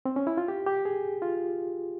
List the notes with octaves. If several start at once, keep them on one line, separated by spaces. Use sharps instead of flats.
C4
C#4
E4
F4
G4
G4
G#4
F4